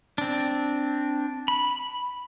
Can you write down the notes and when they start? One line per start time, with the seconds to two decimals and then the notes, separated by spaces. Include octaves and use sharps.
0.18 C4 D4
1.48 B5